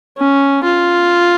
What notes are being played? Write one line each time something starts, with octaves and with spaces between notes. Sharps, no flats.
C#4
F4